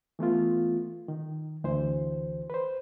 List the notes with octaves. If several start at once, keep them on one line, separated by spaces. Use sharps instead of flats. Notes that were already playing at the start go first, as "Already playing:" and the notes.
E3 A3 B3 F4
D#3
D2 E3 C5
B4 C5